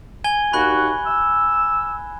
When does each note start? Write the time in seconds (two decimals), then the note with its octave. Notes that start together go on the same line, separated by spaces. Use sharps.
0.24 G#5 G#6 G7
0.53 D#2 F#4 B5 F#6
1.07 E6